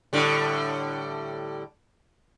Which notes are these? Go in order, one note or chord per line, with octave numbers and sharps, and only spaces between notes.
A2 D3 G3